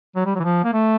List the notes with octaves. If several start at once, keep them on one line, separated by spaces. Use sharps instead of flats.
F#3
G3
F#3
E3
F3
A#3
A3